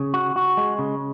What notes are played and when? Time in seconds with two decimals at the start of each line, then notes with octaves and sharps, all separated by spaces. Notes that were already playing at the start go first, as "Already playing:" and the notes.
Already playing: C#3
0.14 F#4
0.36 F#4
0.57 G#3
0.79 C#3